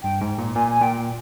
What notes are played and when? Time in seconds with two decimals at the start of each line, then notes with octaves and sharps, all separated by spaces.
0.03 G2 G5
0.21 G#2
0.38 A#2
0.56 A#2 G#5
0.70 G#5
0.82 A#2 G5